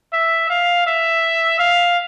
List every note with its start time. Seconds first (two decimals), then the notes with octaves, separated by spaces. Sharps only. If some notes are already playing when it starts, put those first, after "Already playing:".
0.13 E5
0.50 F5
0.87 E5
1.59 F5